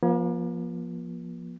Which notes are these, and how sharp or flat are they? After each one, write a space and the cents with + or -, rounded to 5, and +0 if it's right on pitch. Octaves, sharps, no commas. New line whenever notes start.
F3 +0 A#3 +45